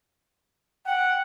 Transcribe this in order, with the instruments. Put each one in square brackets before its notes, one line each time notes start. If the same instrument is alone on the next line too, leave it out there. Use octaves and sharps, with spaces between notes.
[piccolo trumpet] F#5 [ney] G5